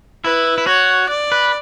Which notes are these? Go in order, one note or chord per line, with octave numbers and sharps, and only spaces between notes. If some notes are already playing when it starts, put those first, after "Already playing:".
E4 B4
E4
F#4 C#5
D5
B4